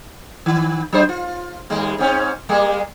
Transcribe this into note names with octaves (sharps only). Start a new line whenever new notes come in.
D#3
F#3 D4 C5
F4
D#2 G3 G#3
G#2 C4 C#4
G3 G#3 A#3